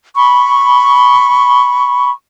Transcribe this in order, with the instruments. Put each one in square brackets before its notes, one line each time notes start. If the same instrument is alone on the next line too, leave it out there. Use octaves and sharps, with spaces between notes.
[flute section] B5 C#6